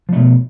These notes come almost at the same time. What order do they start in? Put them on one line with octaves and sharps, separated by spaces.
F3 A3 B2